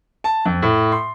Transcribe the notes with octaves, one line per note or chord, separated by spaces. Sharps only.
A5
F2
A2
C6